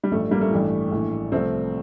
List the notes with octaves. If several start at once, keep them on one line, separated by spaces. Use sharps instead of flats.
G3
A1 G2 F3 A3
G3 A#3
A3
A1 G2 E3
A#1 A2 E3
C2 C3 F3 A3 C4